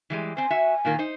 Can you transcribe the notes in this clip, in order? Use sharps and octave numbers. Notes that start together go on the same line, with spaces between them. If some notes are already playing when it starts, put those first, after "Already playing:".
E3 G3 G#3
C4 C5 G#5
F#4 E5
A#2 D#3 A#3
D#4 C5